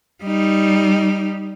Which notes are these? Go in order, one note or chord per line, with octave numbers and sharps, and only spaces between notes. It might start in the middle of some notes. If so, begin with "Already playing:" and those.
G3 D#4